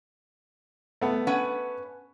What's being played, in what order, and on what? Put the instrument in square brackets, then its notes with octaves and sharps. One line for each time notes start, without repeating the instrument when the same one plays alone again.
[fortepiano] A3 B3
[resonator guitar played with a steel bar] C#4 B4 F#5